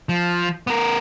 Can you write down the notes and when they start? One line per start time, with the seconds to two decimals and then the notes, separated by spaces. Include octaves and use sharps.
0.09 F3
0.67 B3 A#4